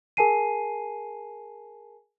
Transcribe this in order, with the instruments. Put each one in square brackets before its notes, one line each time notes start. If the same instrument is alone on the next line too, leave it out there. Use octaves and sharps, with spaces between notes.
[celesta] G#4 A#4 G#5 A5 C7 D#7